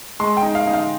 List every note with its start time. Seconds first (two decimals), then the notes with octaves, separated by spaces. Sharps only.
0.20 G#3 C6
0.37 G5
0.43 D#4
0.55 F5
0.67 D#4
0.73 F5